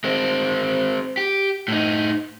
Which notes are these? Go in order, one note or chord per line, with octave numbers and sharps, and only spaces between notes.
G#3 C4
G4
A2 D#4